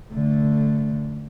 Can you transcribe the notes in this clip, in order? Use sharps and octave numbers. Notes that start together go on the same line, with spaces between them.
D3 A3